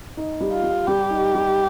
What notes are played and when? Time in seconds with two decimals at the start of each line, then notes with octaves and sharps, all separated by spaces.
0.17 D#4
0.41 G3
0.52 F4
0.63 G3
0.88 G3 G4
1.10 D#4
1.34 G3